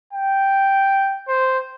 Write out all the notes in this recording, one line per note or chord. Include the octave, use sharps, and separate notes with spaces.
G5
C5